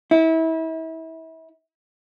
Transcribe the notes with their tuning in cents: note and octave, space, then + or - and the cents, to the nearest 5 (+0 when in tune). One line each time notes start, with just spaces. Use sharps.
E4 -30